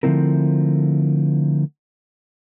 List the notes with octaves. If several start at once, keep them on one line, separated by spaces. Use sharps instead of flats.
D3 F3 A3 C4 E4 A#4